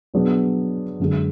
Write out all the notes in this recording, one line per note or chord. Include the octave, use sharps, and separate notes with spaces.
B2 F#3 B3 D4 G#4
F#2 D3 G#3